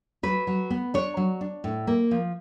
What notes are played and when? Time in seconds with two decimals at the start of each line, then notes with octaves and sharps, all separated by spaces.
0.23 F#3 B4
0.47 F#3
0.70 B3
0.94 D4 C#5
1.17 F#3
1.41 D4
1.64 A2
1.87 A#3
2.11 F3